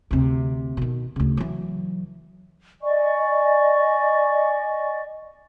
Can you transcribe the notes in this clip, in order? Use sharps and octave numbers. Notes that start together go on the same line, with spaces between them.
D2 C3
B2 D#3
D2 C#3
E3 F#3
D5 D#5 G#5 C#6